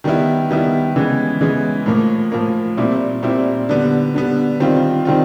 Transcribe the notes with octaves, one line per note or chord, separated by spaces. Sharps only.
D#3 G3 B3 E4
D#3 G3 B3 E4
C#3 E3 G#3 B3
C#3 E3 G#3 B3
A2 F3 A#3
A2 F3 A#3
A#2 G3 C4 E4
A#2 G3 C4 E4
D3 G3 B3
D3 G3 B3
D#3 G3 C4 F4
D#3 G3 C4 F4